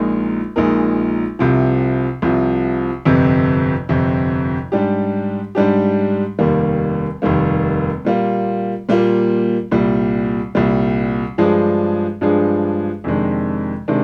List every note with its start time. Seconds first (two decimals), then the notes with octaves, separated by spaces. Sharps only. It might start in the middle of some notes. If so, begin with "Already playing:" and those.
Already playing: A#1 A#2 G#3 D#4 A#4
0.56 A#1 A#2 G#3 D#4 A#4
1.39 C2 C3 F3
2.22 C2 C3 F3
3.05 G1 F2 C3
3.89 G1 F2 C3
4.72 G#2 G3 D4 G4
5.55 G#2 G3 D4 G4
6.39 F1 D#2 D#3 G3 A#3
7.22 F1 D#2 D#3 G3 A#3
8.05 A#2 G3 A#3 F4
8.89 A#2 G3 A#3 F4
9.72 C2 A#2 G3
10.55 C2 A#2 G3
11.38 G2 F3 G#3 D4 G#4
12.21 G2 F3 G#3 D4 G#4
13.04 F2 C3 D#3 G#3 D4
13.88 C3 D#3 G#3 D4